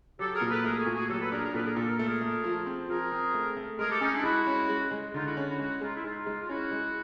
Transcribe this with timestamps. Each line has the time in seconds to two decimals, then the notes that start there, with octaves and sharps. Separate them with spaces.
0.19 F#3 G4 A4
0.34 G#4 A#4
0.41 A#2
0.49 A4 B4
0.64 A3 G#4 A#4
0.79 F#4 G#4
0.86 A#2
0.94 F#4 G#4
1.09 F#3 G4 A4
1.20 A4 B4
1.31 D4 G#4 A#4
1.43 G#4 A#4
1.54 A#2 A4 B4
1.65 G#4 A#4
1.76 A#2 G4 A4
1.88 A#4
1.97 A3 A4
2.07 G#4 A#4
2.21 A3
2.44 F3
2.66 C4
2.89 F3 G#4 A#4
3.12 C4
3.34 A3
3.57 A3
3.79 G#3 G#4 A#4
3.90 G4 A4
4.01 G#3 C#4 D#4
4.13 D4 E4
4.23 G#3 E4 F#4
4.47 C#4
4.69 G#3
4.91 G#3
5.14 D3 D#4 F4
5.25 E4 F#4
5.37 C#4
5.48 E4 F#4
5.59 G#3 E4 F#4
5.81 G#3 D#4 F4
5.95 E4
6.04 G#3 D#4 F4
6.26 G#3
6.40 F4
6.49 C#4 E4 F#4
6.71 G#3